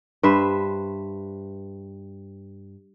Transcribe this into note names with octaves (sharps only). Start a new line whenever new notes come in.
G2 B4 C5 E5